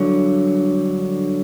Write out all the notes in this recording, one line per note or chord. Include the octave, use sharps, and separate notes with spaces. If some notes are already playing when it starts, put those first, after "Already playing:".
Already playing: G2 D3 F#3